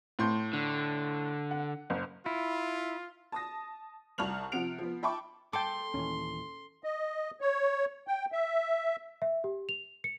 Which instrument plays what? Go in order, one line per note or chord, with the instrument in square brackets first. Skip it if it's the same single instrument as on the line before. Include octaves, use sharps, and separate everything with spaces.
[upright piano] A2 C6 G6
[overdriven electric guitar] D3
[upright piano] F#5
F#1
[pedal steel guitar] E4 [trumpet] F4
[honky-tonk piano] A5 D#6 A#6
C2 A5 C#6 F6 F7 F#7
C3 F3 F#5 D7 F7
F3 B3
E5 G5 A5 B5 C#6 D6
[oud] A4 [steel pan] G5 D6 [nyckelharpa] C6
[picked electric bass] D#2 A#2 E3 [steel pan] C#4
[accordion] D#5
C#5
G5
E5
[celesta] E5
G4
F7
C#7